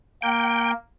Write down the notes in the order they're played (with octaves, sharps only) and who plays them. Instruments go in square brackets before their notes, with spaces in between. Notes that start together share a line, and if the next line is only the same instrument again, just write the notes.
[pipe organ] A#3 [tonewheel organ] G5